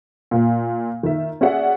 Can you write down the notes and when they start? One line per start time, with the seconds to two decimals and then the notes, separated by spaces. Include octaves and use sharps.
0.31 A#2
1.03 D#3 E5
1.41 C#4 F#4 G#4 D5 E5 F#5